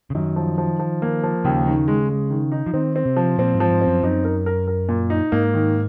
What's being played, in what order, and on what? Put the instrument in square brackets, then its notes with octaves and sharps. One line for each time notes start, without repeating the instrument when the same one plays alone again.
[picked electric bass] C#3
[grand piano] F#2 [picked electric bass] D#3
[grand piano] F3
F3
F3
A#3
F3
[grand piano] D#2 [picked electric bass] C#3
[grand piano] D#3
G#3
G#3
D#3
D#4
[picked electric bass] F3
[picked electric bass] D#3 [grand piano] C4
[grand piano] C4
[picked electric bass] C3
[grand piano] F3
[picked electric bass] A#2 [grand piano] C4
[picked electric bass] G#2
[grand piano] F3
[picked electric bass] G#2
[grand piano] C4
[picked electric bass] F#2
[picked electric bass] F#2 [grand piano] D#4
[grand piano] A#4
A#4
A#4
A#2
D#4
[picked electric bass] G#2 [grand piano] A#3
[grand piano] D#3